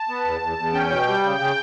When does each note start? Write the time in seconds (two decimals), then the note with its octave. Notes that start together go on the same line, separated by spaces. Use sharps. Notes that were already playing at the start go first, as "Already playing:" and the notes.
Already playing: A5
0.09 B3
0.25 E2
0.41 E2
0.58 E2
0.74 C#4 G5
0.90 B2
1.07 G3
1.23 C#3
1.40 C#3